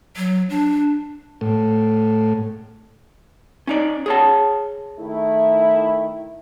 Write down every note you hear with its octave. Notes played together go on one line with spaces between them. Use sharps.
F#3
D4
A2
C#4 D#4 D5
G#4 C#5 A5
D#3 A3 E4